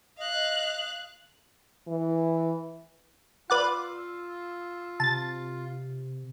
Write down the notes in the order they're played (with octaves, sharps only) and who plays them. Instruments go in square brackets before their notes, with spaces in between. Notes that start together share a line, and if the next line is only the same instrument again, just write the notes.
[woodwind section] D#5 [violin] F5 F#6
[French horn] E3
[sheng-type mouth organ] F4 [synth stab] B4 D5 F#5 [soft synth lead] E6
[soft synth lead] C3 [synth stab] A5 A6